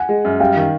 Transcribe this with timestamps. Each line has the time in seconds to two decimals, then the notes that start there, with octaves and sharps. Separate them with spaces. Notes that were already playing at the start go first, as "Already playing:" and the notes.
Already playing: F#5 G#5
0.09 G#3
0.25 F#2
0.40 G3 F5 G5
0.56 D#3